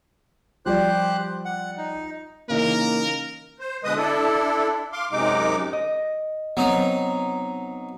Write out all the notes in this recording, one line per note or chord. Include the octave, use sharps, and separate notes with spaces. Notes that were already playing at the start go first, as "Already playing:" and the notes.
F3 G3 G4 C5 D5 F#6
F#5
D#4
C#3 E3 A#3 D#4 A#4
C5
B2 D3 G#3 B4 D#5 D#6
D4 E4 A4
F5 C6 D6
F#2 C3 G#3 D#4 D6
D#5
F#3 B3 C4 D#4